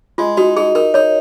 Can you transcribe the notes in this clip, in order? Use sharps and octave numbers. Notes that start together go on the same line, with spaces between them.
G#3 F4
D#4 F#4
D#4 G#4
D#4 A#4
D#4 C#5